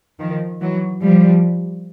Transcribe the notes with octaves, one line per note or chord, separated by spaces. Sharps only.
D#3 F3
E3 F#3
F3 G3